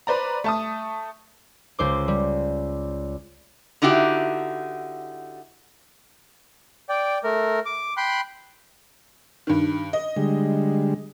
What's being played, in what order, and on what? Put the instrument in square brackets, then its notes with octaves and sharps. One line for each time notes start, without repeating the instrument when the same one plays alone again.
[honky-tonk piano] B4 C5 D5 A#5
A3 A5 D#6
[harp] C#2 C5 D6
G3
[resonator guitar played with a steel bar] D3 D#4 E4 F#4 G4
[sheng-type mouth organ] D5 G5
A3 A#4
D6
G5 B5 C6 F#6
[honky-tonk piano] G2 D#3
D#5
[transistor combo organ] D3 G3 G#3